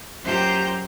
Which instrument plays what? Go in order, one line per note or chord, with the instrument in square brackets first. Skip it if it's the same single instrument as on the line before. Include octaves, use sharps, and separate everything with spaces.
[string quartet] F#2 F4 G4 C5 A#5 G6